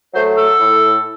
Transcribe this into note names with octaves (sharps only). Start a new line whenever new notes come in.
F#3 A3 C5
A4
A2